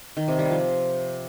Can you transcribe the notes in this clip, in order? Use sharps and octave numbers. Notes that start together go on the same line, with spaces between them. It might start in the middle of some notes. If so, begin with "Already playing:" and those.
D#3
C3
G3
F3